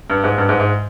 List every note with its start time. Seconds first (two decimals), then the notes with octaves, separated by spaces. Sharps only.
0.10 G2
0.24 G#2
0.38 G2
0.49 G#2
0.59 G#2